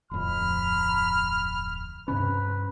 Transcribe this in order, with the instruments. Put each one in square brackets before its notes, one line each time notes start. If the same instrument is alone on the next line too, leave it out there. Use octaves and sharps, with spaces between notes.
[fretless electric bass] D1 F2 [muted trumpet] B5 [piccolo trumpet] F6
[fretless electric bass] G2 C3 C#4 [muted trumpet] B4